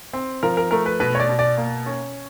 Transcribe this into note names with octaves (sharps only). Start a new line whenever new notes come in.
C4
F3 A#4
A#4
A3 A#4
B4
B2 B4
C#5
D5
B2
D5
A#3
C#4